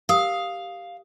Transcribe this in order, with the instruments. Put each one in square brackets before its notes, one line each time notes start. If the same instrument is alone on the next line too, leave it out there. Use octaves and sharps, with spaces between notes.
[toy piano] G4 A#4 D#6 [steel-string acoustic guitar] F5